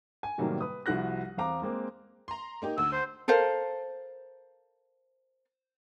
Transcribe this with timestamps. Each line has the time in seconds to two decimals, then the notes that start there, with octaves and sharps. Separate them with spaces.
0.23 G#5
0.38 A2 C3 D#3 F#3 G3 A#3
0.61 B4 D#6
0.86 C2 F3 E4 F#4 F#6 A#6
1.37 E2 C4 F5 A#5 D6
1.62 G#3 A#3 C4
2.28 A#5 C6
2.62 A#3 D#4 G4
2.78 D2 E6
2.92 C5
3.28 A4 A#4 C5 F5